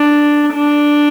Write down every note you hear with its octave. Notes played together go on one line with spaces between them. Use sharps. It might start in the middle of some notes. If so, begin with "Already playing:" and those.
Already playing: D4
D4